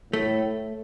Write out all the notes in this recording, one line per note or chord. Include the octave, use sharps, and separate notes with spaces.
A2 A3